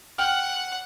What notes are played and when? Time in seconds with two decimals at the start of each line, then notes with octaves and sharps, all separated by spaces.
0.18 F#5 G5 F6